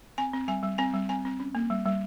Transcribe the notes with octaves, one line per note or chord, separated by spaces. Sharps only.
C4 G#5
C4
G3 G#5
G3
C4 G#5
G3
C4 G#5
C4
C#4
A#3
G3
G3